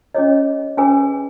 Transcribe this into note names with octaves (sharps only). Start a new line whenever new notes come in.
C#4 G#4 C#5 D#5
C#4 G#4 B4 G#5